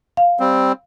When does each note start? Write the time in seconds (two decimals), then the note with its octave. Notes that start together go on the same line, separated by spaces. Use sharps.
0.17 F5
0.40 G3 C4